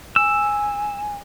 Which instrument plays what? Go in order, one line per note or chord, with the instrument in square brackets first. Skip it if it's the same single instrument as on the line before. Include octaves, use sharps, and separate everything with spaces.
[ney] G#5 [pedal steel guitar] E6